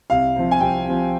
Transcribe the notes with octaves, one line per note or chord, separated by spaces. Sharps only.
C2 F5
C3 F3
G#5
C2 G5
C3 F3